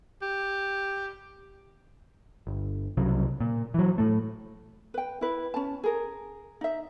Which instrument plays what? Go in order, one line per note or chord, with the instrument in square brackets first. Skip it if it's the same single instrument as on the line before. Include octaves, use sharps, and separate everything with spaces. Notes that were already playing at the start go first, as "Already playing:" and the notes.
[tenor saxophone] G4
[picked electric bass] G1
C2 C#3 F#3
A#2
E3 F#3
A2 A3
[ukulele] B4 G5
E4 B4
C#4 A5
G#4 A#4
D#4 E5